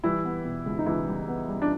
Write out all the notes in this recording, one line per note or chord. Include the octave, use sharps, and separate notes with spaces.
E3 G3 E4
B3
B2
C#2
D#4
C#2 E3 E4
G3
B3
G3
D4